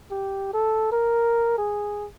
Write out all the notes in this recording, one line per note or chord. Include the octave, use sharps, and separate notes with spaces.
G4
A4
A#4
G#4